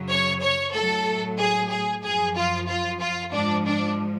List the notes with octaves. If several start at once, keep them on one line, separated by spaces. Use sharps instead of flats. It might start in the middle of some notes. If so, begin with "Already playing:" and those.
Already playing: F#2 C#3 F#3
C#5
C#5
A2 F#3 A4
G#4
G#4
F#2 F3 G#4
F4
F4
F4
G#2 F3 D4
D4